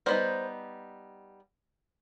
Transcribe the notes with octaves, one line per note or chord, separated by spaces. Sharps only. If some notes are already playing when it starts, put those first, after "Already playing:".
G3 B3 D#4 A#4 C5